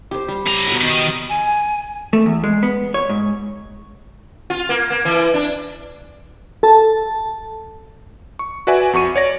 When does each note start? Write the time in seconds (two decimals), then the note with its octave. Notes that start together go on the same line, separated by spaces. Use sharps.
0.11 G4 C5
0.28 G3
0.47 C#3 A#5
0.67 B2 F#5
0.81 D#3
1.29 G#5
2.13 A3
2.26 E2
2.44 G#3
2.63 B3
2.94 C#5
3.10 G#2
4.50 F4
4.69 A#3
4.90 A#3
5.05 E3
5.34 D4
6.63 A4 A5
8.39 C#6
8.67 F#4 B4 D5 E5 G#5
8.93 F2 F#4 C#6 D#7
9.16 C#5 D5 A#6